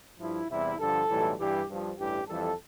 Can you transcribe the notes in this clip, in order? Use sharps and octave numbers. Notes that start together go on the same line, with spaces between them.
G2 F3 E4
E2 C3 G3 E4
G2 D3 F3 A4
B1 A2 E3 G3
G2 E3 G3 G4
G2 F3
A1 G2 E3 G3 G4
F2 E3 G3 A4